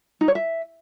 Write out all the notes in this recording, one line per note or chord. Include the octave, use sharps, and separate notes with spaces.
D#4
C#5
E5